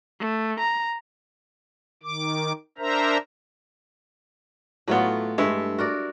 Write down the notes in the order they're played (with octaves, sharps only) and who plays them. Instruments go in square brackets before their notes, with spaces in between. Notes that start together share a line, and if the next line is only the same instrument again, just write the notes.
[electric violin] A3
A#5
[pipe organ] D#3 D6
D4 A#4 C5 E5 A#5
[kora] A2 A3 F4 [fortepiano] F#3 B3
[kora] G2 A3 E5 [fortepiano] G#3
[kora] F#4 A#4 D5